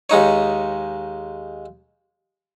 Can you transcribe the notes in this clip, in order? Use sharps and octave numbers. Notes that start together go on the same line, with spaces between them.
D#2 G#3 D#4 C#5